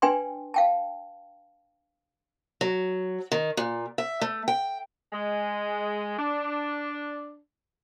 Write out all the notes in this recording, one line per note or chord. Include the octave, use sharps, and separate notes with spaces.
D4 B4 D5 G5 G#5 C6
F5 G5 A5
F#3
D#3
A#2
E5
A3
G5
G#3
D4